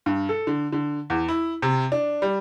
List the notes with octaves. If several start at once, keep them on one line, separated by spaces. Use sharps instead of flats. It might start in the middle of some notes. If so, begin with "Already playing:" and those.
G2
A4
D3
D3
E2
E4
C3
D4
G3